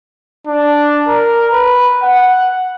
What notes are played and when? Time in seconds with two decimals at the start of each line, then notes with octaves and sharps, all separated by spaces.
0.47 D4
1.07 A#4
1.52 B4
2.03 F#5